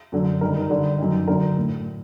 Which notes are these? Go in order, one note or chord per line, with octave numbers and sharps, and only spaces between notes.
F#2 D3
G2 D#3 A#4
A#4
G2 D3
F#2 D#3
F#2 D3 A#4
A2